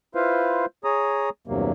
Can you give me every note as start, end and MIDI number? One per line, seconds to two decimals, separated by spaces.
0.15 0.66 64
0.15 0.66 65
0.15 0.66 71
0.15 0.66 72
0.15 0.66 77
0.84 1.30 68
0.84 1.30 73
0.84 1.30 82
0.84 1.30 87
1.47 1.72 40
1.47 1.72 43
1.47 1.72 48
1.47 1.72 54
1.47 1.72 58